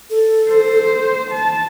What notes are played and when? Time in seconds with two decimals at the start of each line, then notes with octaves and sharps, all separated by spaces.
0.10 A4
0.50 C5
1.31 A5